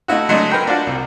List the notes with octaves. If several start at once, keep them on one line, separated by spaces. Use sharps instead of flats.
A3 D#4 E4 F#4
F#3 G#3 A3 D4 D#4 G#4
A#4 B4 G5 A#5
D4 F4 F#4 D5
C2